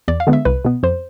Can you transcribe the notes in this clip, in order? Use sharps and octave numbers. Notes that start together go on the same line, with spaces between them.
E2 D5
F5
D3 G#3 B3
E5
C2 B4
B2 B3
F2 C5